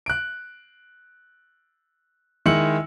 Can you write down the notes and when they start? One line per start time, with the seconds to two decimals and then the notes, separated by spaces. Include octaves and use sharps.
0.06 F#6 D7
2.46 D#3 G#3 E4 E6 C#7 F#7